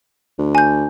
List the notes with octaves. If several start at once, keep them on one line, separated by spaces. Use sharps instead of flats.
D2
G#5 G6